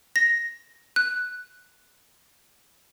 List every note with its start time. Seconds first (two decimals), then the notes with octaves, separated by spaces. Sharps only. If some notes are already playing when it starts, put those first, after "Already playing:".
0.16 A#6
0.96 F#6